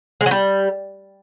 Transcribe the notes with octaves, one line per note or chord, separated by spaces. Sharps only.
G#3
F#3
G3